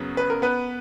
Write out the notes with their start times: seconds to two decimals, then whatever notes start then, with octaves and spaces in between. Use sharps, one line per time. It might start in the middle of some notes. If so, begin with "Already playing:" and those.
Already playing: F#2 C#3 F#3 B3
0.17 B4
0.30 A#4
0.42 B3 B4